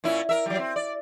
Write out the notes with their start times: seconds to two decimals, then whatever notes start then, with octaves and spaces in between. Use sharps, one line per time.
0.04 A#2 C#4 E4
0.29 A#4 E5
0.46 F#3 G3
0.59 C4
0.76 D5